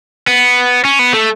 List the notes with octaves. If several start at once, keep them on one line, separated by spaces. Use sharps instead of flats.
B3
C#4
B3
A3